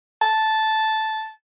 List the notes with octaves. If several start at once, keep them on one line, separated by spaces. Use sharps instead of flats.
A5